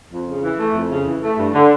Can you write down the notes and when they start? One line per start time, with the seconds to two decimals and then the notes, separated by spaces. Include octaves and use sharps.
0.11 F2
0.27 C#3
0.43 E3
0.59 A3
0.75 F2
0.90 C#3
1.06 E3
1.22 A3
1.38 G2
1.54 D3